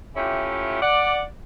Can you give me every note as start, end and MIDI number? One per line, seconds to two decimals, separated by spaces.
0.16 0.82 57
0.16 0.82 61
0.16 0.82 64
0.16 0.82 65
0.16 0.82 67
0.82 1.23 74
0.82 1.23 78